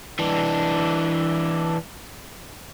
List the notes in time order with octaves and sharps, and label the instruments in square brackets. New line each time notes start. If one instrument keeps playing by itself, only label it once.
[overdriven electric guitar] E3 D4